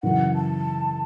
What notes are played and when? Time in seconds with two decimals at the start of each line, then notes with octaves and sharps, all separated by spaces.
0.03 F#2 C#3 E3 F#5
0.35 A5